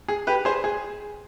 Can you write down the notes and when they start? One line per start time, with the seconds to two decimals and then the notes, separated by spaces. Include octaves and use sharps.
0.08 G#4
0.27 G4 B4
0.45 G#4 C5
0.64 G#4